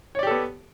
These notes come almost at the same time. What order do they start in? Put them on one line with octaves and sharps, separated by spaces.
C#5 D5 G4 A4 B3